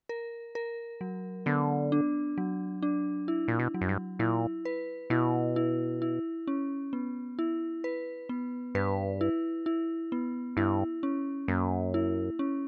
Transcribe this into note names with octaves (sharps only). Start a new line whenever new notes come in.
A#4
A#4
F#3
D3 B3
D4
F#3
D4
E4
A#2
B2
F#3
F#2
G2
A#2 E4
B4
B2 E4
E4
E4
C#4
B3
E4
B4
B3
G2 B4
E4
E4
B3
G2 E4
C#4
F#2 A#3
E4
C#4